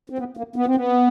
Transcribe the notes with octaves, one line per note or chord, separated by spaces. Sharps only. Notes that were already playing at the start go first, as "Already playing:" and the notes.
C4
B3
A#3
B3
C4
B3